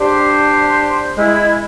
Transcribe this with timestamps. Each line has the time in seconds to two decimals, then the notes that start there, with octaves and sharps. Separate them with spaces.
0.01 D4 G4 C5
1.18 G#3 E4